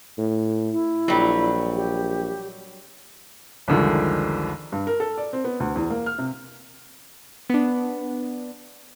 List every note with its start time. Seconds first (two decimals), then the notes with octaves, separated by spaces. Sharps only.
0.18 A2
0.72 E4
1.08 A#1 F#3 G3
1.75 G4
3.68 C2 F2 D3 D#3 F3 G#3
4.72 G2
4.87 A#4
5.00 A4
5.18 D5
5.33 C4
5.44 B3
5.60 D2
5.76 E2
5.90 A#3
6.06 F6
6.18 C3
7.50 B3 D4